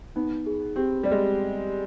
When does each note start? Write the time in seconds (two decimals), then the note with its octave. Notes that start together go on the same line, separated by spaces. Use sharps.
0.16 B3 D#4
0.46 G#4
0.76 C4 G4
1.03 G3 D5
1.11 G#3